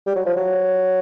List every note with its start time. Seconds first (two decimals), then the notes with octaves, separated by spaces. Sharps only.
0.07 G3
0.15 F#3
0.25 F3
0.36 F#3